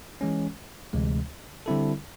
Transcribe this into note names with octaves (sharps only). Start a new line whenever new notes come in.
E3 G#3 C#4
D2 C3 E3 G#3
D3 G3 C4 E4 A4